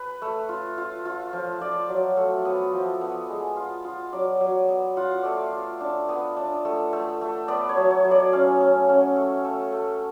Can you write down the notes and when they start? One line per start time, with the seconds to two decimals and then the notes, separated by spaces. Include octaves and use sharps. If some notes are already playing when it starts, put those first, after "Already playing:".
Already playing: B4
0.22 A3
0.49 F4
0.78 F4
1.05 F4
1.33 F3
1.61 F4 D5
1.89 F#3
2.17 A3
2.45 B3
2.73 F3
3.01 B3
3.29 G#3
3.56 F4
3.84 F4
4.12 F#3 D5
4.41 F#3
4.68 B3
4.97 F4 F#5
5.11 F5
5.23 A3 D5
5.37 F5
5.52 F4
5.80 D4
6.09 B3
6.37 D4
6.65 A3
6.93 A3
7.21 A3
7.48 B3 D5
7.69 C#5
7.77 F#3
7.91 C#5
8.05 F#3
8.11 D5
8.33 C#4 F5
8.60 C#4
8.89 C#4
9.16 A3
9.44 A3
9.73 A3